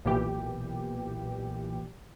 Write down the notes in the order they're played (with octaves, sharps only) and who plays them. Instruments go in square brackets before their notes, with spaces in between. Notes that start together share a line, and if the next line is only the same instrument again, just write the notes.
[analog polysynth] B1 A#2 E3 G4